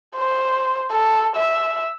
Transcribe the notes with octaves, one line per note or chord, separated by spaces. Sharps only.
C5
A4
E5